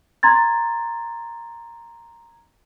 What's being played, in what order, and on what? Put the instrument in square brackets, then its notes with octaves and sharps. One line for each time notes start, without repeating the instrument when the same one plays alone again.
[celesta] A#5 C6 G#6 A6